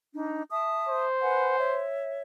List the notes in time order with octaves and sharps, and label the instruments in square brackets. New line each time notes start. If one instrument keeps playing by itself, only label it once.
[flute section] D4 D#4
E5 A5 D#6
[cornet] C5
[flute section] B4 F#5 G#5
C#5 E5